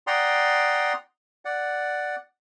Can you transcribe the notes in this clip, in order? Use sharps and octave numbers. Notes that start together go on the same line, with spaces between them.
D5 F#5 G5 A#5 C6 D#6
D5 F#5